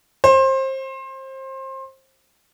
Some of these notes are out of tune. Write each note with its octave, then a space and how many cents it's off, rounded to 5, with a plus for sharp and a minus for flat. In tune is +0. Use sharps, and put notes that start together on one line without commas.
C5 +25